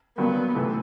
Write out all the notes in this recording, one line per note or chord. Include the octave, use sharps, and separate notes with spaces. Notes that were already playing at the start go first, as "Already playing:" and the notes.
G2 D3 F#3 A#3 B3
C3 E3 A3